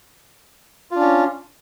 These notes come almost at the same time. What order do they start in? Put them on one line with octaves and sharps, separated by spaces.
F4 D4 C#4